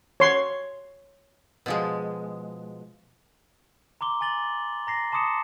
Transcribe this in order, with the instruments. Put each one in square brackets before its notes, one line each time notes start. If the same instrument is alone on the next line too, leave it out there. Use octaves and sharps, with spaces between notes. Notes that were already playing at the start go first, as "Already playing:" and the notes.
[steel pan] C#5 C6
[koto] B2 F3 G#3
[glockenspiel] A#5 C6 D6 G7
G#5 D6 A6 F#7 G7
A#5 A#6 C7
A5 C6 D6 D#6 C#7 E7